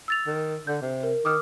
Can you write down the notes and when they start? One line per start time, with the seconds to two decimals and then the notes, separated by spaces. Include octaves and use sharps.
0.08 E6 A6 F7
0.26 D#3
0.67 D3 G6
0.82 C3
1.03 A#4
1.25 D#3 D6 D#6 F6